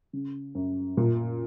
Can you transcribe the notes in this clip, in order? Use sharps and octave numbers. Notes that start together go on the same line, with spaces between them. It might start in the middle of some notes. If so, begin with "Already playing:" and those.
C#3
F#2
A#2